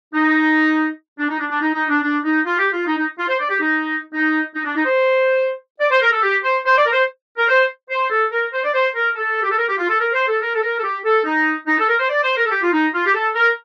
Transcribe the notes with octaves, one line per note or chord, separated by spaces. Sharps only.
D#4
D4
D#4
D4
D4
D#4
D#4
D4
D4
D#4
F4
G4
F4
D#4
D#4
F4
C5
D5
G4
D#4
D#4
D#4
D4
D#4
C5
D5
C5
A#4
A4
G4
C5
C5
D5
A#4
C5
A#4
C5
C5
A4
A#4
C5
D5
C5
A#4
A4
G4
A4
A#4
G4
F4
A4
A#4
C5
A4
A#4
A4
A#4
A4
G4
A4
D#4
D#4
A4
A#4
C5
D5
C5
A#4
A4
G4
F4
D#4
F4
G4
A4
A#4